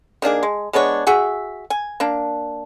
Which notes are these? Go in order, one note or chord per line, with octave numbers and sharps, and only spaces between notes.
D#3 A#3 D4 G#4
G#3
G#3 B3 D4 C#5
F#4 G#4 E5
G#5
A#3 D4